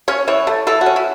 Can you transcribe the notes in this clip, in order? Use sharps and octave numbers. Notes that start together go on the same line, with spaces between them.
C#4 C#5
E3 C#5
A3
E3 A4
F#4
C#4
E4